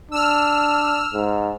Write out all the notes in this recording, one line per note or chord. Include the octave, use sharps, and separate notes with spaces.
D4 E6 F6
G#2